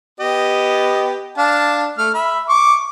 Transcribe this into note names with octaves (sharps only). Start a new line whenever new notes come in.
B3 G4 D#5
D4 F5 A5
A3 F6
E5 B5
C#6 D6